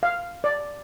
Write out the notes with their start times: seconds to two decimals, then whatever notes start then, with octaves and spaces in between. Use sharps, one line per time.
0.03 F5
0.44 D5